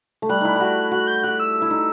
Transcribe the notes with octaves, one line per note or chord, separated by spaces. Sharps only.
A3
G3 F#6
D#4 E4
F#4 G4
F#4 F#6
G6
G4 F#6
E6
E4
D#4